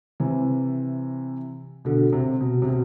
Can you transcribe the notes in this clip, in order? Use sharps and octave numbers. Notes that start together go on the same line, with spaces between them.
C3 E3
B2 D3
C3
B2
C3
B2